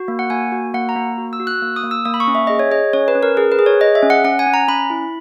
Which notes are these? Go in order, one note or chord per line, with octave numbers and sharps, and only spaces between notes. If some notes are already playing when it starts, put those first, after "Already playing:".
Already playing: F#4
A#3
F#5
A#3 G#5
F#4
A#3 F#5
A#5
A#3
F#4
E6
F#4
F#6
A#3 E6
D#6
A#3
E6
A#3 D#6
B5
C#6
C#4
E5
G#4 D#5
C#5
G#4 D#5
C#4 C#5
B4
C#4
A#4
G#4 A#4
B4
G#4
C#5
G#4 D#5
E5
C#4
F#5
C#4 F#5
G#5
C#4
A#5
C#4 B5
E4